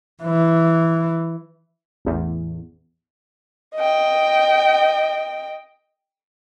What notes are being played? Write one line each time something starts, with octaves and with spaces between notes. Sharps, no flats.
E3
A1 E2
D#5 G5